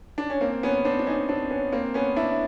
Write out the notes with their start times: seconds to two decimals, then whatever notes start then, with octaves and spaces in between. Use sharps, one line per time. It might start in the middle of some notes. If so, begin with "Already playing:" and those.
0.18 D4
0.30 C#4
0.41 A#3 C4
0.63 B3 C#4
0.85 C4 D4
0.99 D4
1.07 C#4 D#4
1.29 C4 D4
1.50 B3 C#4
1.72 A#3 C4
1.94 B3 C#4
2.16 D4 E4